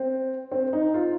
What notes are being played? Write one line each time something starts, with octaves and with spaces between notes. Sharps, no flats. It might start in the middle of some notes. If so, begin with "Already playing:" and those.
Already playing: C4
C4
D#4
F4